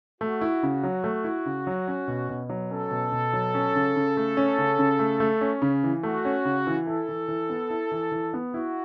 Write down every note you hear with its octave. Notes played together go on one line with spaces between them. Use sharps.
A3 F#4
E4
C#3
F#3
A3
E4
C#3
F#3
C#4
B2
B2
F#3
C#4 A4
B2
B2
F#3
C#4
C#3
C#3
A3
C#4
C#3
C#3
A3
A3
C#4
C#3
E3
A3 F#4
C#4
C#3
E3
E4 A4
E3
E3
B3
E4
E3
E3
B3
E4 F#4